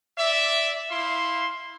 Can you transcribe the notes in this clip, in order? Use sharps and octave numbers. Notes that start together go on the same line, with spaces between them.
D5 E5
E4 F5 C6